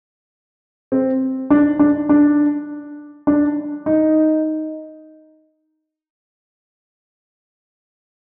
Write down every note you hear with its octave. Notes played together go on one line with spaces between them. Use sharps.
C4
D4
D4
D4
D4
D#4